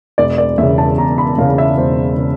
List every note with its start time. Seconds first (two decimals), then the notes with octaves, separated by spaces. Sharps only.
0.18 E1 D5
0.38 D5
0.58 E2 C#3 E5
0.78 A5
0.98 E1 A#5
1.18 B5
1.38 E2 F5
1.41 C#3
1.58 E5
1.78 E1 C5
2.18 C#3